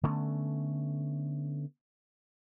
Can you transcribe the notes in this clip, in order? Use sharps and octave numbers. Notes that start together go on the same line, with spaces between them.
D3 A3 B3 C#4